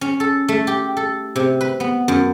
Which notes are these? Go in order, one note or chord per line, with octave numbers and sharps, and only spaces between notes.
C#4
A4
A3
G4
A4
C3
B4
B3
F#2